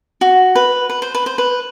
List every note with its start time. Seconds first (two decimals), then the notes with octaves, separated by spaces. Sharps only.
0.21 F#4
0.55 B4
0.90 B4
1.02 C5
1.15 B4
1.26 C5
1.38 B4